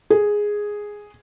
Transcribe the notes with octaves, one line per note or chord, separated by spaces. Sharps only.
G#4